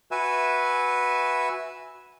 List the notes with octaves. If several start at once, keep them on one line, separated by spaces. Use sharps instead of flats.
F#4 B4 E5 G#5